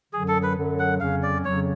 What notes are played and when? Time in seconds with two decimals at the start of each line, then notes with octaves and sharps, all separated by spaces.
0.13 F#2 D3 F#3 G#4
0.28 A4
0.43 B4
0.57 F#2 D3 F#3
0.79 F#5
1.00 F2 C#3 F#3 C#4 F5
1.23 D5
1.44 F2 C#3 F#3 C#4 C#5